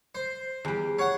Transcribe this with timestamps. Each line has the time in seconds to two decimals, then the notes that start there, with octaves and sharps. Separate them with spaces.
0.15 C5
0.65 E2 G3
0.99 C#5 F5 F#5